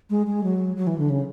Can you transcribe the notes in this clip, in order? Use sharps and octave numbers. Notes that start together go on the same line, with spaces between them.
G#3
G#3
F#3
F#3
E3
D3
C#3